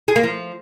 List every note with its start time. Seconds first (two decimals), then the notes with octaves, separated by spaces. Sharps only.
0.08 G#4
0.16 A#3
0.23 F3